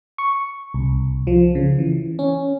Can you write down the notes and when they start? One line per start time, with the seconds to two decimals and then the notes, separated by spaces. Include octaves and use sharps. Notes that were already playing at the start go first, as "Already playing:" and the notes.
0.18 C#6
0.74 C2
1.27 F3
1.55 C#3
1.79 E3
2.19 C#4